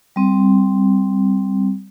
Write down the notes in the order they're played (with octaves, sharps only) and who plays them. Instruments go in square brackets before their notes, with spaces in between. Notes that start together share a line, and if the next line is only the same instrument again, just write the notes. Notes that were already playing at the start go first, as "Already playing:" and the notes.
[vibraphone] G3 C4